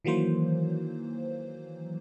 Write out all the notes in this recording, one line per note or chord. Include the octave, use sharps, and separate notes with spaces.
D#3 E3 F#3 A#3 C5